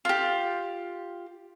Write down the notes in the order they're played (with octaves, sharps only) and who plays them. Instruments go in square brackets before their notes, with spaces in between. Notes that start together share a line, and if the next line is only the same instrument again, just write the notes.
[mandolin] F4 G4